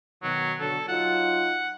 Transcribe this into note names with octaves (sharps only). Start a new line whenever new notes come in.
B2 D#3 F#3
B2 D3 F#3 A4
F#3 D#4 F4 F#5